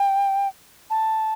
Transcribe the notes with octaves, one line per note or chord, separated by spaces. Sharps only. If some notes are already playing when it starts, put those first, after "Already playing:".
Already playing: G5
A5